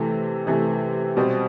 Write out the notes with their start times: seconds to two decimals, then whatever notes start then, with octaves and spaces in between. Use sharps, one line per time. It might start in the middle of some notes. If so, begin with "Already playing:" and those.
Already playing: C3 E3 A3
0.47 C3 E3 A3
1.17 B2 G3 C4